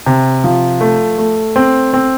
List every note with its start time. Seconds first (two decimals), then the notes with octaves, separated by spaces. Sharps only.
0.06 C3
0.44 F3
0.81 A3
1.18 A3
1.56 C4
1.94 C4